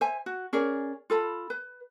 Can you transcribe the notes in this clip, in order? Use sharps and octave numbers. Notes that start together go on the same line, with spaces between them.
C5 E5 G#5
F#4
C#4 G#4 A#4 D5
F4 A4 B5
B4